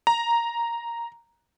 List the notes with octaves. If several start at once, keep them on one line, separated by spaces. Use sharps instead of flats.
A#5